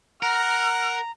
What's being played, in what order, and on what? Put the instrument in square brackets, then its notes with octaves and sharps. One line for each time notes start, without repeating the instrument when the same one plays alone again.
[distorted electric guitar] A#4 [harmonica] F#5 [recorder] A#5 [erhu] F6